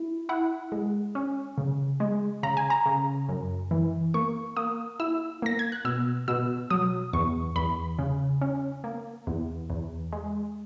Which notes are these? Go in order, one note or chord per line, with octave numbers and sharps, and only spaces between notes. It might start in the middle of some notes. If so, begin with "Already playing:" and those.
Already playing: E4
E4 F#5
G#3
C#4
C#3
G#3
C#3 A#5
G#5
A#5
C#3
F#2
E3
A#3 C#6
A#3 D#6
E4 E6
A#3 A#6
G#6
F#6
B2 E6
B2 E6
F#3 D#6
E2 C#6
E2 B5
C#3
C#4
A#3
E2
E2
G#3